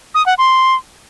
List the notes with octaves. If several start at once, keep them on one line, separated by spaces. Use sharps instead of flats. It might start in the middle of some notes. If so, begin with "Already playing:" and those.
D#6
F#5
C6